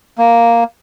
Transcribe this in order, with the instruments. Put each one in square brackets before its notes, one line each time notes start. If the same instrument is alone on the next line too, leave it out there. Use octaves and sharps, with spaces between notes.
[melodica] A#3